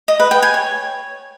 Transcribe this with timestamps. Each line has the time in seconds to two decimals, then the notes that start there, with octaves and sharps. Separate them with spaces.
0.08 D#5
0.20 B4
0.31 G5
0.42 G#5
0.54 C#5